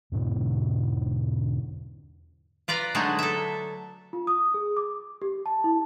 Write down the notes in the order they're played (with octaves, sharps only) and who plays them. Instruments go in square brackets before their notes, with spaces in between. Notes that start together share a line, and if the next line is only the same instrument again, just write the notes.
[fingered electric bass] E2 G#2 B2 D3
[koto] F4 B4 D5 A#5
D3 F#3 G#3 A3 D4 D#4
A4 E5
[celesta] F4
D#6
G#4
D6
G4
A5
E4